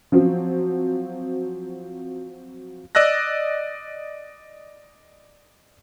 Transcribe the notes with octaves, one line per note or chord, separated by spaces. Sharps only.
F3 F#3 C4
D5 D#5 E6 F#6 A#6